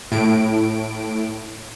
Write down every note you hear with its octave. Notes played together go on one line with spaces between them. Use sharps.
A2 D7